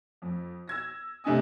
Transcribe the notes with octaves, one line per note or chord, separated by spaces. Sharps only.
F2
E6 G#6 A#6
C3 A3 D4 D#5 G#5 D#6